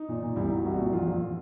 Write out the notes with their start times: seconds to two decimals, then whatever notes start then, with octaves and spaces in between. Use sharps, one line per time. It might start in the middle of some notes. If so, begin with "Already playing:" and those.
Already playing: D#4
0.09 A#2
0.23 A#2
0.36 C2 E4
0.50 C2
0.56 F#4
0.64 C2
0.74 A#2 F#4
0.92 A#1 F4
1.07 A#1